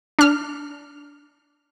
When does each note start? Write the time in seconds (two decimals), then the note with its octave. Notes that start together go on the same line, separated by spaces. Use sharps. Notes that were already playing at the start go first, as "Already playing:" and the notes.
0.19 D4 F6